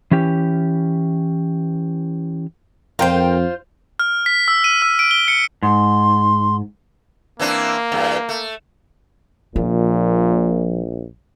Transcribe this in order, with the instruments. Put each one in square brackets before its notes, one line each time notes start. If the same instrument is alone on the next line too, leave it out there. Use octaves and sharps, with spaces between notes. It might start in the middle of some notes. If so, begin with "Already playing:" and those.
[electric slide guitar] E3 C#4 G4
[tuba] F2 [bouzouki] F4 C5 [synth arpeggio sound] A#4 G5
[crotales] F6
B6
E6
D#7
E6
D7
G7
C#7
[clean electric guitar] G#2 [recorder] C6
[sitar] E3 C4 D4 [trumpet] A#3
[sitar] E2 G2
A3
[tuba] A#1 [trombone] A#2 [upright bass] F3